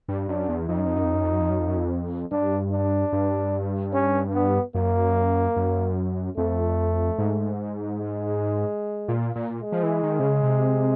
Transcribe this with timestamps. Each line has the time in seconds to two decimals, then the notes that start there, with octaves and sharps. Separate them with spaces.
0.08 G2
0.28 F#2 D4
0.49 E2
0.68 F2 D#4
0.78 F#2
0.86 F2
0.96 F#2
1.04 F2
1.14 F#2
1.24 F2
1.33 F#2
1.40 F2
1.50 F#2
1.60 F2
1.68 F#2
1.77 F2
2.31 G2 D4
2.72 D4
3.13 G2
3.93 C#4
4.34 B3
4.75 F#2 A#3
5.56 F#2
6.37 F2 A3
7.18 G#2
7.99 G#3
9.08 A#2
9.36 A#2
9.62 G#3
9.72 F3
9.83 E3
10.03 D#3
10.19 C3
10.23 C#3
10.43 C3